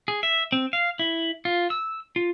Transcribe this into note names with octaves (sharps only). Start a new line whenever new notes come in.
G#4
E5
C4
F5
E4
F4
E6
F4